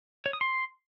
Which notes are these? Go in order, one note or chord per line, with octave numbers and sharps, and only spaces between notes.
C#5
D#6
C6